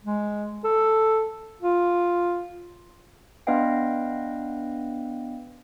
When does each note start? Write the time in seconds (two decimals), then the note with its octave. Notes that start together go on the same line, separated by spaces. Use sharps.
0.04 G#3
0.64 A4
1.61 F4
3.47 B3 D4 B4 D#5 F5 G5